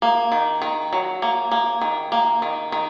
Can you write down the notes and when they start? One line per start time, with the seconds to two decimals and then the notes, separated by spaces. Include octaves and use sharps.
0.02 A#3
0.32 D#3
0.62 D#3
0.93 F#3
1.22 A#3
1.51 A#3
1.81 D#3
2.12 A#3
2.42 D#3
2.72 D#3